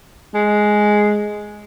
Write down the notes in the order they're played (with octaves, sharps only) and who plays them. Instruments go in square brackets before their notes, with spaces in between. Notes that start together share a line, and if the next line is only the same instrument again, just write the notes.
[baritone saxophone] G#3